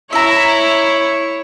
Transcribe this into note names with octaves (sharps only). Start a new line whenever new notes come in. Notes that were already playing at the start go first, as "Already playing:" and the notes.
E4 C#5 E5 A#5